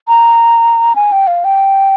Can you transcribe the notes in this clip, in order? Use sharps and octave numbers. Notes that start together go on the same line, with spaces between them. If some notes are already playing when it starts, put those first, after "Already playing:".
A#5
G#5
G5
F5
G5